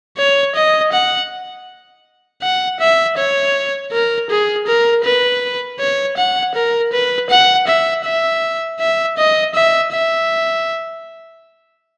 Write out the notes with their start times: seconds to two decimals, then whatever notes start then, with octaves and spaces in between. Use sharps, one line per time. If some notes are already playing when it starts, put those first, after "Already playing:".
0.18 C#5
0.55 D#5
0.92 F#5
2.42 F#5
2.80 E5
3.18 C#5
3.92 A#4
4.30 G#4
4.67 A#4
5.04 B4
5.80 C#5
6.17 F#5
6.55 A#4
6.93 B4
7.30 F#5
7.67 E5
8.05 E5
8.80 E5
9.17 D#5
9.55 E5
9.92 E5